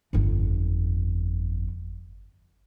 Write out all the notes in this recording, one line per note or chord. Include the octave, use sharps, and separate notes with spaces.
G1 F2